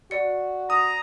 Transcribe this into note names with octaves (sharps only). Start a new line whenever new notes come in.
F#4 D5 C#7
A#5 D#6